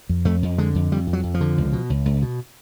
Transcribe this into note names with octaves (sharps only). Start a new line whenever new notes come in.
F2
F2 A3
F2
D3 G#3
F2
F2 G3
F2
F#3
F2
F3
D3
C#2
B2
C#2
C#2
B2